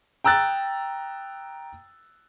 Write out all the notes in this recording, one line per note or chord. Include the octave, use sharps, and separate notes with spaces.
G5 A#5 E6 F#6 A6